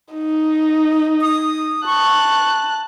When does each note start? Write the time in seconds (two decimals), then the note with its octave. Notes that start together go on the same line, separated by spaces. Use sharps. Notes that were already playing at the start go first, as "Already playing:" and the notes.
0.14 D#4
1.21 D#6
1.86 A5 C#6 F#6